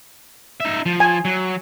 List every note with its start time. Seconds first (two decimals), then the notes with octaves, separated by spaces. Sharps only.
0.60 D#4 E5
0.86 F3
1.00 G#5
1.25 F#3